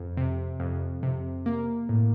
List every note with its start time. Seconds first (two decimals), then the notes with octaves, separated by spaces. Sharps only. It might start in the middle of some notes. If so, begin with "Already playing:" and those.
Already playing: F2
0.17 C3
0.60 F2
1.03 C3
1.46 A#3
1.89 A2